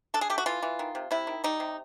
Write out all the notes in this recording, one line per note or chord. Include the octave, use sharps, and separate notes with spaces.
D4 A4
G#4
A3 G4
F#4
E3 F4
E3
D#3
C3
C3 E4
D#3
G3 D#4
C3